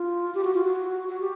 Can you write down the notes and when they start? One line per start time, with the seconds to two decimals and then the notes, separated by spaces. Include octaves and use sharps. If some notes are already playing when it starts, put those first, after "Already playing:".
Already playing: F4
0.35 G4
0.44 F#4
0.54 F4
0.64 F#4
1.09 F#4
1.20 G4